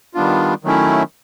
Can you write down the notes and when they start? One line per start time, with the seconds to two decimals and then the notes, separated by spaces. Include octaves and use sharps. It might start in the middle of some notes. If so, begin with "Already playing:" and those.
0.14 D#3 G3 B3 D4 F4
0.64 D#3 F#3 A3 C#4 E4